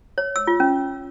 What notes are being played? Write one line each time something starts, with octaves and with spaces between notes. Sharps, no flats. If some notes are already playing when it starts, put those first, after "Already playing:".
C#5
E6
F4
C#4